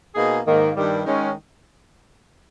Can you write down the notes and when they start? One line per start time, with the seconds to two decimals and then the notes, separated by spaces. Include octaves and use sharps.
0.15 B2 A#3 D#4 G#4
0.47 G#2 D#3 A#3
0.76 G2 D#3 G3
1.06 D#3 G#3 C#4